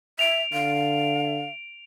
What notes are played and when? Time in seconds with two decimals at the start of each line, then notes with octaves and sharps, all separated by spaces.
0.19 E5 D7 F7
0.53 D3 F5